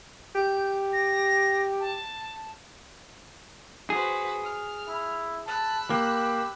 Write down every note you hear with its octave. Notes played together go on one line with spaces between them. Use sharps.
G4 G6
A#6
A5
F#4 G#4 B4 C5
F6
E4
A5 B5 E6 F#6
A#3 G4